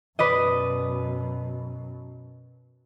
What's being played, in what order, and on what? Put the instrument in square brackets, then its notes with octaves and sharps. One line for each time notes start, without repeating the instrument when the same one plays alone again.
[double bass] F#2 B2 [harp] B4 D5 D#5